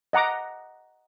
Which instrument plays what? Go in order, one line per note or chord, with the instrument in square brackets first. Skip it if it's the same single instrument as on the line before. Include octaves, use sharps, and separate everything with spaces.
[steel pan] D#5 F#5 A#5 D6